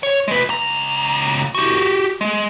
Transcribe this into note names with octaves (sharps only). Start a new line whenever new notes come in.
C#5
G#3 B4
C#2 A#5
F#4 G4
G#3